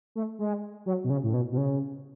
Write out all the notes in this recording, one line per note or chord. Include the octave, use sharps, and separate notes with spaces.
A3
G#3
F#3
B2
C#3
A2
B2
B2
C#3